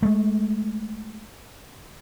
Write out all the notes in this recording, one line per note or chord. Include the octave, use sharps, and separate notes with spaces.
G#3 A3